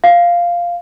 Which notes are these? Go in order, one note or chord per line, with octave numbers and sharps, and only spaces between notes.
F5